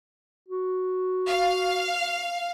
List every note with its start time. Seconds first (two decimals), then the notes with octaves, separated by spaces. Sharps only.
0.48 F#4
1.26 F5